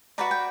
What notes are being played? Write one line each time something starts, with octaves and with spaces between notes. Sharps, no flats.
F#4 B4 D5 A#5
G5